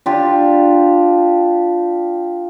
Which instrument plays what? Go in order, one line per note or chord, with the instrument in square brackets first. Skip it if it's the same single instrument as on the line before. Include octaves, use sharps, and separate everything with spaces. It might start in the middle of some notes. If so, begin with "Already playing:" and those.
[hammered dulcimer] D4 F4 G4